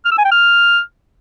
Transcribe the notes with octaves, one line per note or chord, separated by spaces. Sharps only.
F6
E6
G#5
G5
F6